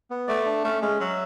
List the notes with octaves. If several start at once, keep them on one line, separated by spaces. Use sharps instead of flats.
B3
A3 D5
D4
A3 C#4
G#3 C#4
F#3 E5